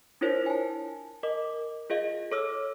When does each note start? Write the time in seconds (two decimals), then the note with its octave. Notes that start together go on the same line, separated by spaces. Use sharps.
0.21 D4 E4 F4 A#4 C5 C#5
0.46 G#5 A5
1.23 A#4 D#5 D6
1.90 F4 G#4 D#5 F5
2.32 A4 C#5 D6 E6 F6